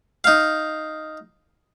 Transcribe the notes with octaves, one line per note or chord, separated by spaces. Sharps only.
D#4 F5